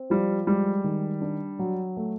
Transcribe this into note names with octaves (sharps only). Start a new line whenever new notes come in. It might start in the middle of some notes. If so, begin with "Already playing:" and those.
Already playing: C4
F3 G3
G3 G#3
D#3
D4
F#3
A3